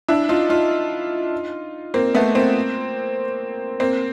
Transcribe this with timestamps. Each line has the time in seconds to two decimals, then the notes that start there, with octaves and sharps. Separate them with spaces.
0.08 D4 E4
0.29 D#4 F4
0.49 D#4 F4
1.94 A#3 C4
2.15 A3 B3
2.35 A#3 C4
3.80 A#3 C4